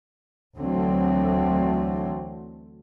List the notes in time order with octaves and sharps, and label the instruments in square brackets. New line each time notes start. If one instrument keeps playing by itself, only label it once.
[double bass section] D2 D3 E3 F#3 A3 C4